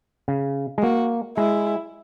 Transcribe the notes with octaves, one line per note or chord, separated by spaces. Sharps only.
C#3
G#3
A#3 F#4
G#3 E4